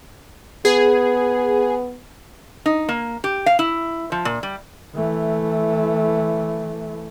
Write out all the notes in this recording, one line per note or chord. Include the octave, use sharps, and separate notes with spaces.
B3 G#4
D#4
A#3
G4
F5
E4
F3
A#2
G3
E3 A3